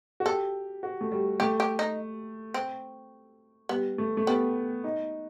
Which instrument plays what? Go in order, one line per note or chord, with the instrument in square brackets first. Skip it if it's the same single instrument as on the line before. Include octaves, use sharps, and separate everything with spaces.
[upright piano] F#4
[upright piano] G4 [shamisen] A4
[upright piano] F#4
A3
G3
[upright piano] A3 [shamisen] G4
[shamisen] G4
D#4
C4
[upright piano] G3 [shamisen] B3
[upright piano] A3
A3
[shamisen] G3 [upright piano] B3
[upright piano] D#4